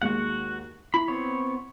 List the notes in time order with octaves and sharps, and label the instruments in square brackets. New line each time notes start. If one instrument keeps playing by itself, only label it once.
[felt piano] D#2 G#3 C#7 [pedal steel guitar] F#4 F#5
[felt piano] E4 [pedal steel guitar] B5
[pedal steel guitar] B3 C4 C#5